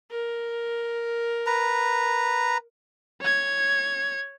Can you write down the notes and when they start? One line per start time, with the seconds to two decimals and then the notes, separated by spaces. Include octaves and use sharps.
0.10 A#4
1.46 B4 A#5
3.21 C#5 G#6